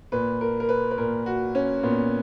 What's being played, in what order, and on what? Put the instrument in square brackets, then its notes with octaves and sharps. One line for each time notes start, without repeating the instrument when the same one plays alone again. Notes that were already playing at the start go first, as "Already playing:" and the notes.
[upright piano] A#2 B4
A#4
A#4
B4
B4
A#2 A#4
F#4
C#4
A#2 B3